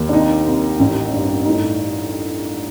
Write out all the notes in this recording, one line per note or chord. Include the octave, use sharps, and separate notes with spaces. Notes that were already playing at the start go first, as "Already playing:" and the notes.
Already playing: D#2
D4
C2 D#4
C2
A1
G2
A2 D#4